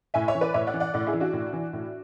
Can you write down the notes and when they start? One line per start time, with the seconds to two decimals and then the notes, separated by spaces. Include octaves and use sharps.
0.14 A2 E5 G#5
0.28 C#5 E5
0.35 E3
0.41 B4 D5
0.54 A2 C#5 E5
0.67 D5 F#5
0.73 E3
0.80 D5 F#5
0.94 A2 D5 F#5
1.07 E4 G#4
1.13 E3
1.20 D4 F#4
1.33 A2
1.53 E3
1.73 A2